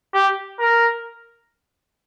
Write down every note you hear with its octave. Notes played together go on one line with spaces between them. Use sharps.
G4
A#4